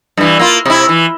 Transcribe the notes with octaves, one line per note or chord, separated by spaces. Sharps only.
G2 E3
A#3 F4
C3 E4
E3